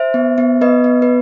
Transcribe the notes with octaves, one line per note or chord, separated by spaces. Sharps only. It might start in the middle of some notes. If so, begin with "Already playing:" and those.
Already playing: C5 E5
B3
B3
B3 B4 D#5
B3
B4